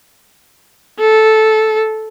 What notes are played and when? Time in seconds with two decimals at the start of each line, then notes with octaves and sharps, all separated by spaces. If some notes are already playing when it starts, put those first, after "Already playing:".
1.00 A4